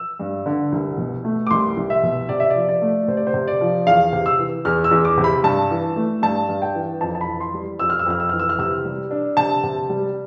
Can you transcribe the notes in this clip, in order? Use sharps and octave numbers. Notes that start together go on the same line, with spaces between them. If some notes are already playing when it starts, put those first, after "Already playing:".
Already playing: E6
G2
D3
C2
B2
A3
D6
C2 C6
C2
E5
B2
C3 D5
E5
F3 D5
D5
A3
C3 C5
D5
C5
C3
D5
F3
E2 F5
C3
E6
E3
E2 F6
E6
E2
D6
C3
B5
G2 A5
E3
A3
G2 A5
G2
G5
E3
F2 A5
A5
B5
E3
C6
G3
F2 E6
F6
E6
F2 F6
E6
E3 F6
E6
F6
C3 E6
G3
D4
C3 A5
C3
G3